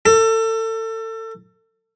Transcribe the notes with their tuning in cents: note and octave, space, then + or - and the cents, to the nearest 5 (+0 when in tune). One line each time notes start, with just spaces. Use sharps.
A4 +30